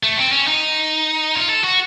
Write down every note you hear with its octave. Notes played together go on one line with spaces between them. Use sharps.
A3
C4
C#4
D#4
F4
A4
F#4